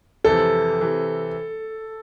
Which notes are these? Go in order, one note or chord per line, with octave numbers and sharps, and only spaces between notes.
F2 C3 E3 A4
C3 E3